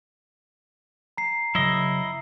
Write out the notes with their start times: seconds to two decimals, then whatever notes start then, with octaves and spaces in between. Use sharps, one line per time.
1.17 A#5 C7
1.55 C#3 F#3 E4 D#5